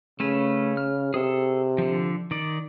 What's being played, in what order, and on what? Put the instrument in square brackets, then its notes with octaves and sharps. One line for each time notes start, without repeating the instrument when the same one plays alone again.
[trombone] C#3 [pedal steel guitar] A3 C#4 B4
[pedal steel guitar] F6
[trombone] C3 [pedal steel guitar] G#4 A4
[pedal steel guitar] D3 F3
D#3 D5